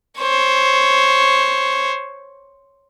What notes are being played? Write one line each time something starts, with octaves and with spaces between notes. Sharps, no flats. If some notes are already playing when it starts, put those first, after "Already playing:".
C5 C#5